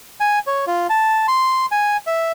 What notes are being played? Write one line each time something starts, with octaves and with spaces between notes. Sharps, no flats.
G#5
C#5
F4
A5
C6
G#5
E5